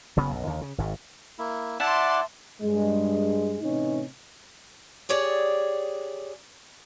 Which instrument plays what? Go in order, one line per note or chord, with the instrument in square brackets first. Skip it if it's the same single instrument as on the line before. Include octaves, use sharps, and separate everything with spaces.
[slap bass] F#1 C#3 B3
B1 F#2
D#2 D3
C#3
G#1 G#2
[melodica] A#3 E4
[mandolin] E4 [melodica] D5 F#5 D6 [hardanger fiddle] A5 C6
[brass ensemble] G2 G#3
A2 C3 E3 C#4 D#4
[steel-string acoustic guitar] G4 G#4 C#5 D5